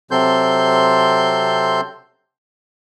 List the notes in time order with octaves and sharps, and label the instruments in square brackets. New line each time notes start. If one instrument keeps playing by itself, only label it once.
[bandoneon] C3 F#3 C4 A4 C6 G6